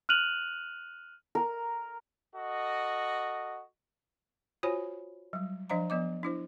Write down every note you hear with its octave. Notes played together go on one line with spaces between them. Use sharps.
F6 F#6 D#7 F7 F#7
A#4
F#4 A4 D#5
F4 F#4 C5 C#5 G#5 B5
F#3 G3
F3 D4 C5 D#5 F5 A#5
F3 B3 D#5 D6
D4 E4 C5